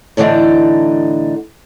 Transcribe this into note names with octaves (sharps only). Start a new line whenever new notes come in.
A2 D3 E3 D4 D#4